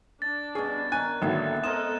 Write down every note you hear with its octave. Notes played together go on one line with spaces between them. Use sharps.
D4 A6
B2 G3 C#4 G#4
D#3 C#4 G#5 F#6
G#1 D3 F#3 A#3 B3 E4 E5
G#3 B3 C4 A4 A#4 D#5 D#6 E7